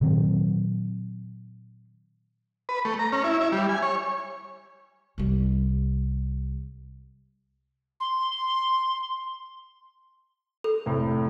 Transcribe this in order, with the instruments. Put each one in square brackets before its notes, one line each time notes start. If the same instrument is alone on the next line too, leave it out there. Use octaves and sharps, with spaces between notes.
[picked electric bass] A#2 D#3 F#3 C4
[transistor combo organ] B4
A3
A#5
C#4
E4
E4
G3
G#5
C#5
[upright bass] C2 G3
[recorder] C6
[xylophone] A4
[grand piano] F1 A2 C4